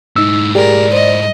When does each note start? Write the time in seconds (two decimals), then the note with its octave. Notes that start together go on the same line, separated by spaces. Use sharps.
0.16 G#2 D#4 E4 E6
0.55 G4 G#4 A#4 D5
0.93 C5 D#5